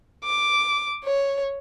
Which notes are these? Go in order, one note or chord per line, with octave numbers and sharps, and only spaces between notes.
D6
C#5